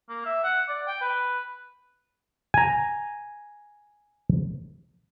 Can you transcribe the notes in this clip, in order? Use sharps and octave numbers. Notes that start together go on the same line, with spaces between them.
A#3
E5
F#5
D5
G5
B4
G#5 A#5